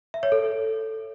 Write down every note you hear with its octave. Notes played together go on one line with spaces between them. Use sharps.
E5
C#5
A4